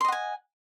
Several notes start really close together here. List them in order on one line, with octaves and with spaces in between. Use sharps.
C6 D#5 F#5 G#5